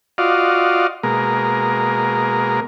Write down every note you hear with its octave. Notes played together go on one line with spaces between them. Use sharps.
F4 F#4 D5 D#5 F5
B2 G#3 A#3 A#4